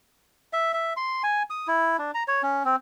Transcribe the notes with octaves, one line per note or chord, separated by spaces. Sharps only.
E5
E5
C6
G#5
D#6
E4
D4
A#5
C#5
C#4
C4